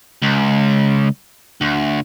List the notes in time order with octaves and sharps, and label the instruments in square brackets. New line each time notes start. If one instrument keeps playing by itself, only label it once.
[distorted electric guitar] C#2
D2